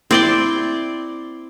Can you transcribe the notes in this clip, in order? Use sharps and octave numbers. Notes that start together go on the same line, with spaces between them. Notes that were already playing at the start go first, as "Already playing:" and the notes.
C4 E4 D5 C6